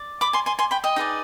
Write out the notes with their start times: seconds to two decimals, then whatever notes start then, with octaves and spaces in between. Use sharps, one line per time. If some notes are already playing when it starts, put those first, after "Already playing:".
Already playing: D5
0.21 B5 D6
0.33 G#5 C6
0.46 G#5 C6
0.59 G#5 C6
0.71 G5 B5
0.84 D#5 G5
0.96 D#4 G#4 B4 D5